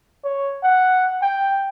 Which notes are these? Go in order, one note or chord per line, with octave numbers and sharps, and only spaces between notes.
C#5
F#5
G5